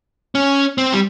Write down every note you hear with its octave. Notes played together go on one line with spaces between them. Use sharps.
C#4
C4
G3